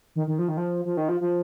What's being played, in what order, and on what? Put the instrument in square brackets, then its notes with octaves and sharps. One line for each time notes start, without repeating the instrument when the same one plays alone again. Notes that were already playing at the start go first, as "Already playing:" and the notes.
[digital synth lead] D#3
D#3
F3
D#3
F3
F3
D#3
F3
F3